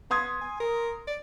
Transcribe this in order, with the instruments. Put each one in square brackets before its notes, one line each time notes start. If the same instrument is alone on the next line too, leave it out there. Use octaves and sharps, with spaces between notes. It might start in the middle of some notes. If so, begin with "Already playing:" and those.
[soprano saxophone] B3 [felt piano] C6 D#6 G#6
[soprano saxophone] G#5
A#4
D5